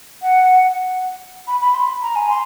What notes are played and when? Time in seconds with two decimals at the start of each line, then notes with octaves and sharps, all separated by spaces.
0.22 F#5
1.47 B5
1.61 B5
1.75 C6
2.02 A#5
2.16 G#5
2.29 C6